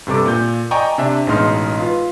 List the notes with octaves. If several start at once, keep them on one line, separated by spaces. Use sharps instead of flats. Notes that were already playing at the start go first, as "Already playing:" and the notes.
G2 C3 A4 D6
A#2 G6
D5 D#5 G5 G#5 A#5 C#6
C3 D4 E5
A1 B2 G#3 D#4 C6 F6
F4 B4